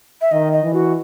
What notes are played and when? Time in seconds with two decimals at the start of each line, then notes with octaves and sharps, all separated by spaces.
0.21 E5
0.31 D#3 D#5
0.53 D#5
0.64 E3
0.74 F#4